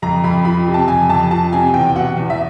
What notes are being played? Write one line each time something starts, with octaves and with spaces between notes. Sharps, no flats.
F2 A#5
F2 B5
F3 B5
C3
A5
F2 G#5
F2 A5
F3 A5
C3 G#5
E2 G5
B2 F#5
E2
E5